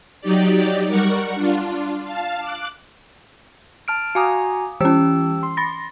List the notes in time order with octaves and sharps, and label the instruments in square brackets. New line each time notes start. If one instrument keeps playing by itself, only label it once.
[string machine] F#3 D#4 G4 D5
G3 A#4 F#5 C#6
D4 F4
F5 A5
D6 F#6
[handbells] A5 F6 D7
[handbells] F#4 G#5 A#5 [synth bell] F5 D6 D#6
[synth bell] E3 C#4 [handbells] G4 G5 E6
[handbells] C6
[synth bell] B5 A6 A#6